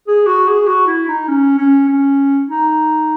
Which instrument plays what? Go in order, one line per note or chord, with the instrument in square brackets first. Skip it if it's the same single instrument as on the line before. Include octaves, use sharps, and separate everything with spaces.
[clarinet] G#4
F#4
G#4
F#4
E4
D#4
C#4
C#4
C#4
D#4